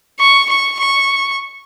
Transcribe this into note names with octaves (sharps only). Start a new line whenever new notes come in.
C#6
C#6
C#6